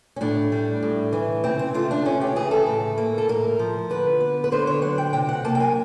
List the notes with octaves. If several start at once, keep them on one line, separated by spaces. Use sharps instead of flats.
C#4
A2 D4
G3
A2
E3
C#3 C4
C4
A3 F4
D4
C#3 C#4
G4
E3 G#4
A4
A2
A#3
A4
A2 A#4
F3
D3 B4
B3
B4
D3 C5
C#5
F#3 F#5
G5
C3 G5
F#5
A#3 A5
G5
G#5